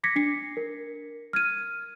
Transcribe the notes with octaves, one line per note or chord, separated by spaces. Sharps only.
D6 G#6 A#6 B6 C#7
D4 C7 C#7
A#4
F6 G#6 D#7